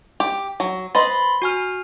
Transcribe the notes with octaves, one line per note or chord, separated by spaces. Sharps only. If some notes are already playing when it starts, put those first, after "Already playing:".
G4
F#3
B4 C5 D#5 B5 C6 A6
F#4 G#5 F6